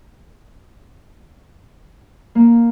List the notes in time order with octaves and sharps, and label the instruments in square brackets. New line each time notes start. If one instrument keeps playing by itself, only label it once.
[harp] A#3